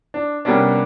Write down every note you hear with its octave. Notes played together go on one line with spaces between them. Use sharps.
D4
C3 G3 A#3 B3 C#4 D4